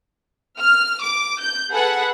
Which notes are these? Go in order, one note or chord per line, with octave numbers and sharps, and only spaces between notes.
F6
D6
G6
G#4 A4 B4 F#5